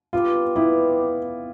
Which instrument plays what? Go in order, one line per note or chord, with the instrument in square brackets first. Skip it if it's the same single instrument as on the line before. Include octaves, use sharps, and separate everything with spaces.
[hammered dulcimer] G3 B3 D4 G4 [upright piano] F4
[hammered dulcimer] G3 B3 D4 G4 [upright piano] E4